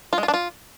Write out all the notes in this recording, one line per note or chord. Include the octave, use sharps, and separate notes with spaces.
F4
G#3
F4
D4
F4